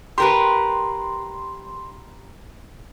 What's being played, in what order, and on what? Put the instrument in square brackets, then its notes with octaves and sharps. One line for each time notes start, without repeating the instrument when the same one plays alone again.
[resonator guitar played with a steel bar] G4 A#4 B4 [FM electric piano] C6